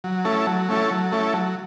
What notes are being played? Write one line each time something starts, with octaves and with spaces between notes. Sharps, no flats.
F#3
A3 C#4 E4 A4
F#3
A3 C#4 E4 A4
F#3
A3 C#4 E4 A4
F#3